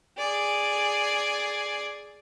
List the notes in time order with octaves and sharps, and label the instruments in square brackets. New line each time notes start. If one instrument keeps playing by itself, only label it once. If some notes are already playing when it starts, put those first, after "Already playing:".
[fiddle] G#4 D5